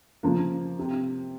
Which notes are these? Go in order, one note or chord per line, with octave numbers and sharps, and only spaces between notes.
C#3 F3 A#3
C3